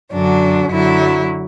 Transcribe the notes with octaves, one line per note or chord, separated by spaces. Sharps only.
F#2 D3 F#3 D4
F#2 D3 F#3 E4